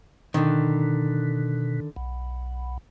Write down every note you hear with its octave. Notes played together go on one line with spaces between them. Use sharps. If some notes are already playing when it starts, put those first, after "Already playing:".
B2 D3 D#3
B1